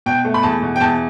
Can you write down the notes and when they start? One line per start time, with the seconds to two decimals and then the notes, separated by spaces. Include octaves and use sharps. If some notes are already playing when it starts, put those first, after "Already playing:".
0.06 B2 G5
0.25 A3
0.34 B5
0.43 E2 A5
0.62 B2
0.76 G5
0.80 E2 A5